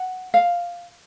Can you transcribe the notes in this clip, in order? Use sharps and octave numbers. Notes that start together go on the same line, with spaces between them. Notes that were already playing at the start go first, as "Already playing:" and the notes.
Already playing: F#5
F5